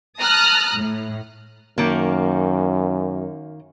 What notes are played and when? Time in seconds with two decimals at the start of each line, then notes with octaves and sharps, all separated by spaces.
0.19 A5 A#5 D#6 F6 F#6
0.75 A2
1.78 F#2 D#3 A#3